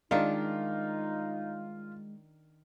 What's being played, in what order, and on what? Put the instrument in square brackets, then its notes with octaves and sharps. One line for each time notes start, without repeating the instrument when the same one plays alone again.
[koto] D#3 D4 [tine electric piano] G#3 [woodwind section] D#4 [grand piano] F4